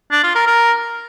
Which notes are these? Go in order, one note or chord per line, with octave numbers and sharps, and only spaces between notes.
D4
F4
A#4
A#4